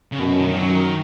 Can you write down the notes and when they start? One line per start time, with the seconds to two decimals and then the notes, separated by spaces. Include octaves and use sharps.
0.12 C#3
0.19 F#2 B2
0.38 D#3
0.48 D#3
0.57 F#3
0.75 D#3